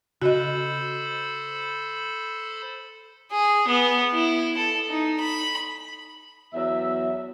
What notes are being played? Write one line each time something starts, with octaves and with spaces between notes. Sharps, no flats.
C#3 F#4 A4 C5 D#5 B5
G#4
B3
E4
A4
D#4
B5
E2 F#3 E5